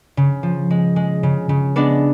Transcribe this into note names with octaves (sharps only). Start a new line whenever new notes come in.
C#3
F3
G#3
G#3
C#3
C#3
G#3 B3 D4